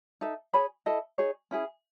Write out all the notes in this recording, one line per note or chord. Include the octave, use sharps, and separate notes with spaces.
D#4 A4 E5
G#4 C#5 G#5 B5
E4 A4 D#5
D#4 G#4 C#5
C#4 E4 G#4